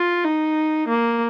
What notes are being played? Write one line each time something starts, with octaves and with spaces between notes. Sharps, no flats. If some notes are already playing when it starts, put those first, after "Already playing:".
Already playing: F4
D#4
A#3